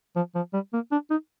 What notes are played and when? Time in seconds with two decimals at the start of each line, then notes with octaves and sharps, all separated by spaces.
0.16 F3
0.35 F3
0.53 G3
0.73 A#3
0.92 D4
1.11 D#4